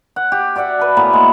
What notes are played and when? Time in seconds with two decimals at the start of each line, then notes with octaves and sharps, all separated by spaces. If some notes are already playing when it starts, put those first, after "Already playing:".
0.16 F#5
0.32 G4
0.56 F#4 D5 E5 F#5
0.79 A4 B4
0.97 A2 A#3 B3 G#5
1.13 G#3